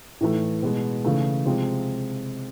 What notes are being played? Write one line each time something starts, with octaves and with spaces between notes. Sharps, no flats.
A2 E3 A3
B2 G#3 B3
C#3 E3 A3
C3 F3 G#3